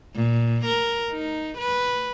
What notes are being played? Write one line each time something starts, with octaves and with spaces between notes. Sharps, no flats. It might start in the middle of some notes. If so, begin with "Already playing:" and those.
A#2
A#4
D#4
B4